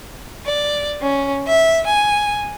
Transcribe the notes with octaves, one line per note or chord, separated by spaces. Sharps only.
D5
C#4
E5
G#5